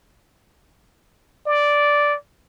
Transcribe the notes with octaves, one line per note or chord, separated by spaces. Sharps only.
D5